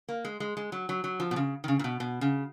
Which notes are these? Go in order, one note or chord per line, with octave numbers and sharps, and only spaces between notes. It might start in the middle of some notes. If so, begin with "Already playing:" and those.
A#3
G#3
G#3
G#3
F#3
F#3
F#3
F3
B2
C#3
D#3
C#3
A#2
B2
B2
C#3